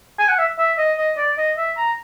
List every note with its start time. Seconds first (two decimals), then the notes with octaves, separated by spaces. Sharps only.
0.19 G#5
0.29 F#5
0.38 E5
0.58 E5
0.78 D#5
0.98 D#5
1.18 D5
1.38 D#5
1.57 E5
1.77 A#5